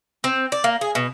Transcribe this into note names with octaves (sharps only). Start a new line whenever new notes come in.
C4
D5
A#3
G#4
B2